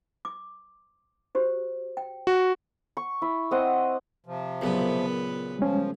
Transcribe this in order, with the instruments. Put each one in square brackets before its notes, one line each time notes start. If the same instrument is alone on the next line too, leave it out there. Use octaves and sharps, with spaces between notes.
[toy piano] D6
F#4 G4 C5
G5
[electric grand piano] F#4
[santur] C#6
E4
C4 D#5 F#5
[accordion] C3 F3
[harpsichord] C#2 F#2 A#2 [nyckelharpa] B3 B4
[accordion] F3 [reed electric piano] G3 G#3 C#4